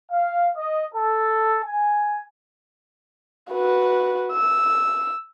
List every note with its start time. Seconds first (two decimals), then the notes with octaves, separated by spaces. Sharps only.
0.12 F5
0.57 D#5
0.95 A4
1.64 G#5
3.52 F#4 B4
4.32 E6